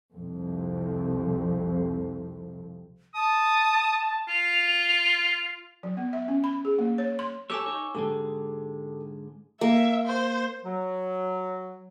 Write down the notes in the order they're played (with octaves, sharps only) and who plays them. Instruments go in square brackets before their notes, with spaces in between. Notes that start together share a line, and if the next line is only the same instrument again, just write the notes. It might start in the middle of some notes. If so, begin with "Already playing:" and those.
[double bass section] C2 F2
[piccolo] A5 [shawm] D#6
[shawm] F4 [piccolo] F7
[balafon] F#3
B3
E5
C#4
B5
G#4
A#3
C#5
C6
[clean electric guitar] G4 A4 C#5 [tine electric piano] G#5 D6 E6
[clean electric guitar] D#4 C#5
[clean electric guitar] G#2 D3 G#3 [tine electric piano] G4 A4
[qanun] A#3 [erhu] E5
[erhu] C5
[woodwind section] F#3